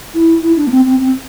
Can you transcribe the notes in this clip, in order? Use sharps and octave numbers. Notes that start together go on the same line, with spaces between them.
E4
E4
D4
A#3
C4
C4
C4